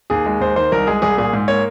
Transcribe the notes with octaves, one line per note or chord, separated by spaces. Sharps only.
D#2 G#4
G#3
D#2 C5
D#3 C5
C2 A#4
G#3 G#4
C2 G#4
A#2 G#4
G#2
A#3 C#5